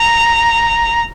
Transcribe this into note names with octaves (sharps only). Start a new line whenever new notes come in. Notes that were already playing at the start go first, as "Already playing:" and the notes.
Already playing: A#5